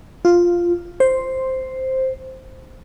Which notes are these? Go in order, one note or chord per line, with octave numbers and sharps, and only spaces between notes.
F4
C5